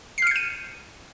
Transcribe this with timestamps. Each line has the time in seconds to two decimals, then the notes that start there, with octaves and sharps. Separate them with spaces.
0.18 C7
0.22 F6
0.27 C#7
0.31 G6
0.36 D#7